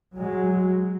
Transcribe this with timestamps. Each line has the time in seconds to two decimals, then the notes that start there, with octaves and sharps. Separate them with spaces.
0.17 F#3 G#3